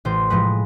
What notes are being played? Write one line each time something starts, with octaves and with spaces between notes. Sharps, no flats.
A1 C5
A2 F3 G#3 B4